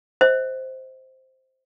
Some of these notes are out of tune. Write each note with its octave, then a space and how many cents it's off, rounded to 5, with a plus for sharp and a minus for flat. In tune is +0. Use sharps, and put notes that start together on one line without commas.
C5 +0 D#5 +40